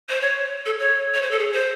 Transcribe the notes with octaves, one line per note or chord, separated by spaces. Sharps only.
C5
C#5
A4
C#5
C#5
C5
A4
G#4
C5